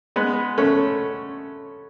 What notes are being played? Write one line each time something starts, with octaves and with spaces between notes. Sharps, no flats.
G#3 B3
A3 C#4